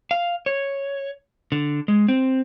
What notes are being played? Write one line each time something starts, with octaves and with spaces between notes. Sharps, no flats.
F5
C#5
D3
G#3
C4